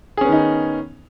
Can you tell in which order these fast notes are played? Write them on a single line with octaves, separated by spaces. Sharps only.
G#4 C#4 B3 D#3 D#4